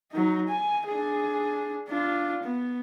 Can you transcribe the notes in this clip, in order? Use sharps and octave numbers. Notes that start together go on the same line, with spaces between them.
F#3 D#4
G#5
D4 G#4
D4 F4
B3